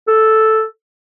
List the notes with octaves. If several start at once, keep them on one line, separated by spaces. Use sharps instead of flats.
A4